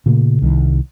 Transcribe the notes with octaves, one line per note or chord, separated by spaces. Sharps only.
A#2 C#3 A3 A#3
C2 D#3